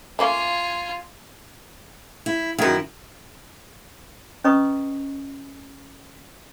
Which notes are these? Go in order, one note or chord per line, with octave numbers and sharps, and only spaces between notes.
A3 A#3 C#4 F4 G#5
E4
F#2 D#3 E4 A#4
C#4 B4 D#5 A#5 C#6 D#6